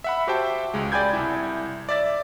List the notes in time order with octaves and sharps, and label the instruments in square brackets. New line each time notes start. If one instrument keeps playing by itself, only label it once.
[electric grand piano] E5 F#5 B5
F#4 G4 C5 E5 G5 A5
C#2 G#3
D5 G5 G#5 B5 G6 G#6
C2 E4
D5 E5 A6